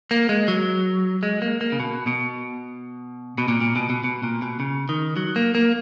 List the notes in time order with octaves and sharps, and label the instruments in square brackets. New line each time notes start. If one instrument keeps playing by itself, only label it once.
[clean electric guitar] A#3
G#3
F#3
G#3
A#3
A#3
C#3
B2
B2
B2
A#2
A#2
B2
B2
B2
A#2
B2
C#3
D#3
F#3
A#3
A#3